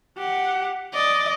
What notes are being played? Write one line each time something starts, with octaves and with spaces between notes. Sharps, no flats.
G4 F#5
D5 D#5